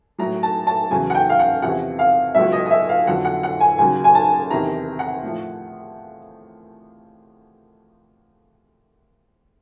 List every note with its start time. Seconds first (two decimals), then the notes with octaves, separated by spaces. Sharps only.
0.18 A2 F#3 A#5
0.43 A5
0.67 A5
0.91 E2 C#3 F#3 G#5
1.10 F#5
1.15 G5
1.29 F5
1.39 F#5
1.62 E2 C3 F3 F#5
1.99 F5
2.35 C#2 B2 F#3 E5
2.52 D#5
2.66 D#5
2.71 E5
2.89 F5
3.07 F2 D3 F#3 F#5
3.25 F#5
3.43 F#5
3.61 G#5
3.78 D#2 C#3 F#3 G#5
4.04 G#5
4.15 A5
4.51 E2 C3 D#3 A#5
4.99 F#5
5.23 A2 F3